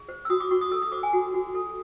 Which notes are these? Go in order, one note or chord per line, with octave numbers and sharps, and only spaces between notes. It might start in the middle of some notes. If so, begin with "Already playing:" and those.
Already playing: G#4
C5
E6
F#4 D#6
D6
F#4 C#6
D#6
A4 E6
D#6
C5 D6
G#5
F#4
F#4
A4